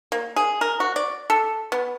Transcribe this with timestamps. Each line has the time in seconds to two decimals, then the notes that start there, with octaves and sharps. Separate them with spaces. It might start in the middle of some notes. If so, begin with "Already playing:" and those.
0.12 A#3
0.36 G#4
0.61 A#4
0.80 F#4
0.96 D5
1.30 A4
1.72 B3